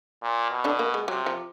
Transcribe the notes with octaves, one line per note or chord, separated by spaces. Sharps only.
A#2
B2
D3 D4
A#3
G#3
C3 F#3
F3